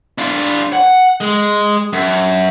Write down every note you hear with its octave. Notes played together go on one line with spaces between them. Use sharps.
D4 F4
F#5
G#3
F#2